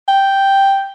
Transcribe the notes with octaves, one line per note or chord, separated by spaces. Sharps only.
G5